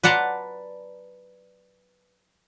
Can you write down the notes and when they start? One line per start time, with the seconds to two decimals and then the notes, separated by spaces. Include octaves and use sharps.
0.03 B4 D5 F#5 A5 A#5 C6